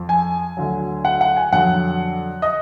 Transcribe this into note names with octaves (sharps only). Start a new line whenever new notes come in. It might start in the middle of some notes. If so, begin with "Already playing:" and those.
Already playing: F2 F3
G#5
D2 D3 F#3
F#5
F#5
G#5
F2 D3 F#3 F#5
D#5